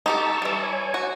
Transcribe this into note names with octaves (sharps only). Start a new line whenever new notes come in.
D#4 G4 A4 A5 C#6 E6
E3 G3
C#5 G#5
F#4